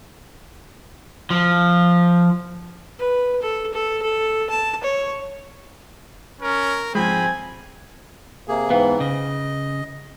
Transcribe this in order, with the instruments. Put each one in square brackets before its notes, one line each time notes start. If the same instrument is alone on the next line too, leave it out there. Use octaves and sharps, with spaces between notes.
[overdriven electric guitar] F3
[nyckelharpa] B4
A4
A4
A4
A5
C#5
[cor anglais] C#4 [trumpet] A#4
[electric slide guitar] G#2 F3 G#3 [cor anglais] C4 [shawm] G#5 [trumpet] B5
[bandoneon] C3 A#3 G#4
[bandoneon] G#2 E3 [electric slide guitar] B3 [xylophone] B4 F5 G5
[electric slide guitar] C#3 [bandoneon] D#5